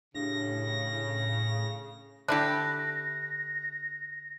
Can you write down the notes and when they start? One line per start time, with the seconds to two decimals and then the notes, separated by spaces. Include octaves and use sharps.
0.15 A2 C#3 D4 G4 A#6
2.28 D3 D4 E4 G4 A4 F#6 A#6